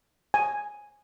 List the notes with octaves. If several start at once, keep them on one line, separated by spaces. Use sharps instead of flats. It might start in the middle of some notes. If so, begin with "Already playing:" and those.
G#5